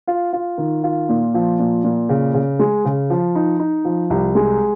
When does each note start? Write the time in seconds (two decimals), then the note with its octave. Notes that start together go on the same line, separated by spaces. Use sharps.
0.07 F4
0.33 F4
0.58 D#3
0.83 F4
1.09 A#2
1.34 F3
1.59 A#2
1.84 A#2
2.09 C#3
2.34 C#3
2.59 G#3
2.85 C#3
3.10 F3
3.35 D#4
3.60 D#4
3.85 F3
4.10 C2
4.35 G#3